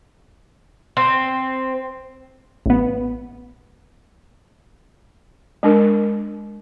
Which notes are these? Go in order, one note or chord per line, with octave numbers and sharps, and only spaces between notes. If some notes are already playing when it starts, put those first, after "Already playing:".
C4
A1 B3
G#3 D4 A#4